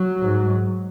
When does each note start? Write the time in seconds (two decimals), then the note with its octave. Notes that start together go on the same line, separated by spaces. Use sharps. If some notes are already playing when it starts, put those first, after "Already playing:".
Already playing: F#3
0.22 G#2